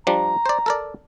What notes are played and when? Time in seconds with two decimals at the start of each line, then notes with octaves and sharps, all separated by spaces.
0.07 F3 G3 D4 A#5
0.46 C5 D5
0.66 A4 A#4 D5